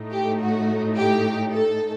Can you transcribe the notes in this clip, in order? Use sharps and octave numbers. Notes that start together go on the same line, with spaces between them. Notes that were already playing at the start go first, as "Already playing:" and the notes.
Already playing: A2 A3 D#4
G4
F#4
G4
A4